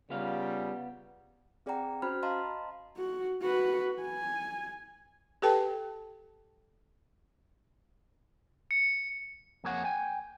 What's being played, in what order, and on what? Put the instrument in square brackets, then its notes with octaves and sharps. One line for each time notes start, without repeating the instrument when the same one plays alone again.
[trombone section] C#3 G3 F4 [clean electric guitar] B3 F5
[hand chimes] C4 G#4 D5 F#5 G5 A#5
C#4 F#4 C5 B5 F6
D#5 F5 A5 A#5 C6
[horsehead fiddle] F#4
F#4 B4
G#5
[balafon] G4 A4 B4 G5 A5
[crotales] C#7
[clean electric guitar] F2 A#3 G#4 C#5 F#5
G5 G#5